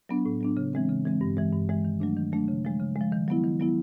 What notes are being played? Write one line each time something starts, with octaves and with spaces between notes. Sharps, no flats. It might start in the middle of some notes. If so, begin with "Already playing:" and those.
F#3 B3 D4
A2
F#3 B3 D4
C#3
E3 G#3 C4
C#3
E3 G#3 C4
G2
E3 G#3
G2
E3 G#3
D#3
F#3 A3 D4
D#3
F#3 A3 D4
C#3
F3 G#3
C#3
F3 G#3
D#3
F#3 B3 E4
D#3
F#3 B3 E4